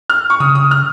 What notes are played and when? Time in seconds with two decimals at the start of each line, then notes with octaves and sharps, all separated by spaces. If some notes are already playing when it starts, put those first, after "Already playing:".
0.10 F6
0.30 C#6
0.40 C#3 D#6
0.55 D#6
0.71 F6